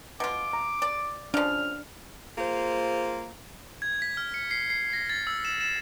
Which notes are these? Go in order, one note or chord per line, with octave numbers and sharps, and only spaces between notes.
B2 F4 D6
A#5
D5
C#3 F3 D4 F6
A#3 F4 G#4 C5
G#6
B6
F6
C#7
C7
C7
A#6
A6
E6
E7
E7